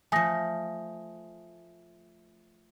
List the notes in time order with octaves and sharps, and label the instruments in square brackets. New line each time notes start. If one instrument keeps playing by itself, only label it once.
[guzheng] F3 A3 [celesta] G#5 D#6 A#6